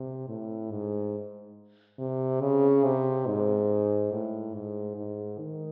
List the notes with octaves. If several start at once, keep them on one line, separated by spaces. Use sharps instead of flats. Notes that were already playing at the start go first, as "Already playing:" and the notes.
Already playing: C3
A2
G#2
C3
C#3
C3
G#2
A2
G#2
G#2
D#3